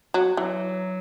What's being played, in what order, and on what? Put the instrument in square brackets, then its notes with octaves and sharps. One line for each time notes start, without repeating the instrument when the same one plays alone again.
[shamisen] F#3
[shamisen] E3 [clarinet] F#3